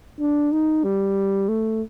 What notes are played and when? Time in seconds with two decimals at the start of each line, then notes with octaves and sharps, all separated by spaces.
0.20 D4
0.52 D#4
0.84 G3
1.48 A3